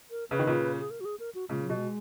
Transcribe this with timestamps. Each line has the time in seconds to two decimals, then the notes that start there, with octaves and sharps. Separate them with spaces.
0.11 A#4
0.30 C#3 B4
0.39 D#3
0.47 A#2 C#3
0.79 G#4
0.90 A#4
1.01 F#4
1.05 G#4
1.20 A#4
1.35 F#4
1.49 A#2 C#3 G#3
1.63 F#3
1.70 B2
1.77 G#3